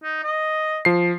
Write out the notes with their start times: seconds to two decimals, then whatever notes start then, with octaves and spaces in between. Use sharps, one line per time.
0.03 D#4
0.23 D#5
0.85 F3 C7